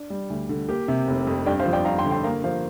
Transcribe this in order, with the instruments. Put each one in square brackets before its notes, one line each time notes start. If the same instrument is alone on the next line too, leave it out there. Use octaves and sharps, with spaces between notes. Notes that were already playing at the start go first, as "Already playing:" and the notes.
Already playing: [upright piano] D4
G3
D2
D3
A#3 G4
C3
F1
F2
G2 D5 G5
C5 F5
F3
D5 G5
G2 F5 A#5
G5 C6
D3
G5 C6
A#3 F5 A#5
F3 C5 F5